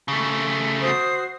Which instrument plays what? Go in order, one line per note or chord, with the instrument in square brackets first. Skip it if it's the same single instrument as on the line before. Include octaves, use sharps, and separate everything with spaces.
[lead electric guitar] C#3 A3
[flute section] F#4 C5 D#6